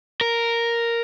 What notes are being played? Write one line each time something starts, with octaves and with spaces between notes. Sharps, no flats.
A#4